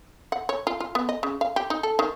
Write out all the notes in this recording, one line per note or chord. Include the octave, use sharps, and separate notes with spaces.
F#5
C#5
F4
F4
B3
D#5
C#3
F5
G4
D#4
A4
D#3